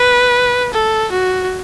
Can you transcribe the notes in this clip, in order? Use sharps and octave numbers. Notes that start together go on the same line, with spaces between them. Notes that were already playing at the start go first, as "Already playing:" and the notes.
Already playing: B4
A4
F#4